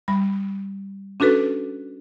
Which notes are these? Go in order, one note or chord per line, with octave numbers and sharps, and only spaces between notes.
G3 B5
C#4 D4 F#4 A4 B4